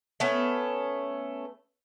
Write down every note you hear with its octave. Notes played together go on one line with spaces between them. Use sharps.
A3 B3 C#4